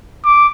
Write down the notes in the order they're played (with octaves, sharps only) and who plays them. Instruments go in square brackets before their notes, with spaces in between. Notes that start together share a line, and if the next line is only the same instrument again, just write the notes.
[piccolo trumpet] D6